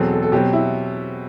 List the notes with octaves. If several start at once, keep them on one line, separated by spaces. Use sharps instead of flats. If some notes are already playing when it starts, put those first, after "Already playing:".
Already playing: E2 B2 F#3 C4 A4
A4
A4
B2 F#3 C4 G4
E4